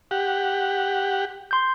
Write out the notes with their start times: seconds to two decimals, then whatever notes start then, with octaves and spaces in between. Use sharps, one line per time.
0.11 G4 F#5
1.51 C6 G6